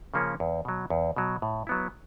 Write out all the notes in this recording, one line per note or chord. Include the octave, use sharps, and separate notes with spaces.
C#3 F3 A#3 C#4
E2
B2 F#3
E2
B2 F#3
A2
F#3 B3 E4